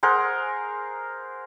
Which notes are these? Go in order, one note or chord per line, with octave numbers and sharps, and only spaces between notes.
G#4 A#4 C5 F#5